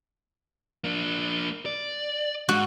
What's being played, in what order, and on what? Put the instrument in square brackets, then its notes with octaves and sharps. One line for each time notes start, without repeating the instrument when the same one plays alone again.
[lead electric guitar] A#3 D4
D5
[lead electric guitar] G#2 [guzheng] F#4